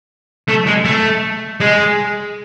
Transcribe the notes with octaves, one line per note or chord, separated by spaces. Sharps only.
A3
G#3
A3
G#3